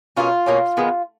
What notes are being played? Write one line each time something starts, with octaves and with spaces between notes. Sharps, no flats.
B2 A#3 C#4 F4
B2 A#3 C#4
D#3 G#3 B3